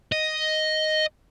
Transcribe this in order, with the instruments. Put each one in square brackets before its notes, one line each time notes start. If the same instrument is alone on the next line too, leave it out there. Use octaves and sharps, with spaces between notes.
[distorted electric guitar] D#5